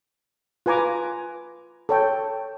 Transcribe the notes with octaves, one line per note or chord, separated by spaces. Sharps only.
F4 B4 G#5 A#5 D6
A4 C#5 G5